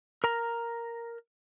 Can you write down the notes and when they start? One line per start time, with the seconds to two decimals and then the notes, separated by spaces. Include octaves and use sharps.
0.24 A#4 A#5